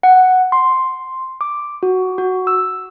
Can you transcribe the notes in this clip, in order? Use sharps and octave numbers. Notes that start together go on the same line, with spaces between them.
F#5
C6
D6
F#4
F#4
E6